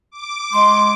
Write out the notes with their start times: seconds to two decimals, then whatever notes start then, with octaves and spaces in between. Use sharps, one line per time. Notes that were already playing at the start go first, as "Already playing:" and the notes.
0.11 D6
0.53 G#3 C6